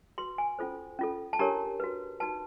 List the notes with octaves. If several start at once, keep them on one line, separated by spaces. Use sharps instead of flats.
F#4 B4 C6
G#5
C#4 F4 A4 C5
C#4 F4 A4
A5
D4 G4 A#4 C#5 A#5
F#4 B4
D#4 F#4 B4 A5